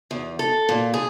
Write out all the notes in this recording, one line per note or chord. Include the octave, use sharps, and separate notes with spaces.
E2
A4
A#2
G#4